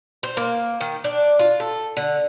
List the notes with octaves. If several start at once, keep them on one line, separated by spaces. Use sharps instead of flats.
C5
A#3
D#3
D4
F4
A4
D3